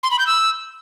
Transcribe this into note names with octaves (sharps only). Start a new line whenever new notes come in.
C6
B5
G6
E6